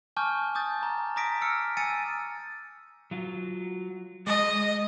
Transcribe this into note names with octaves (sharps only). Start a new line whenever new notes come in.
G#5 A5 C#6 D6 F6 G6
D6 D#6 G6 A6
A#5
A#5 D6 D#6 A#6 B6 D7
E6 F6 C#7
G#5 E6 A6 C#7 D#7
F#3 F4
G#3 D#5